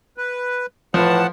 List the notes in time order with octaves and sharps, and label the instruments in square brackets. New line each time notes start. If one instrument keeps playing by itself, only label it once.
[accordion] B4
[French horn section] A2 E3 B4 [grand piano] F3 [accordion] F#5 A5